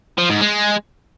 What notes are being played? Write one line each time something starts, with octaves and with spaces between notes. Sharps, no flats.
F3
G#2
G#3